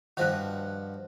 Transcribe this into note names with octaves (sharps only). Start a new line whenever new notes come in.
G2 D#3 F3 F#4 F#6